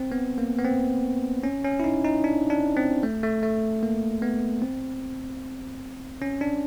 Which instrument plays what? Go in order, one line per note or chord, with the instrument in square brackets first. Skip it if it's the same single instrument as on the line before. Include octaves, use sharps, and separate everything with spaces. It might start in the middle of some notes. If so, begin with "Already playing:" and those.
Already playing: [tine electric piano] C4
B3
A#3
B3
C4
C#4
C#4
E4
D#4
D#4
D4
D4
C4
A3
A3
A3
A#3
B3
C4
C#4
D4